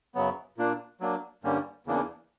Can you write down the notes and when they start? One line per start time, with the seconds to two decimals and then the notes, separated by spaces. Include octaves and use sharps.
0.15 F#2 C#3 F#3 B3
0.58 A#2 A#3 D4
1.00 F#3 A#3 D4
1.43 G2 D3 G3 A#3 C#4
1.87 E2 C#3 E3 A#3 D4